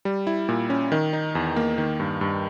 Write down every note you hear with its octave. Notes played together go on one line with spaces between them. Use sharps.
G3
E4
A#2
C#4
D#3
D#4
E2
A#3
D#3
G2
G2